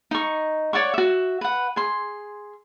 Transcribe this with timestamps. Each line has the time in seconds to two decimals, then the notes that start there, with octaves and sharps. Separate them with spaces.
0.11 D#4 C#6
0.73 C#5 D5 F#5 C#6
0.94 F#4 E5
1.41 B4 F#5
1.76 G#4 C6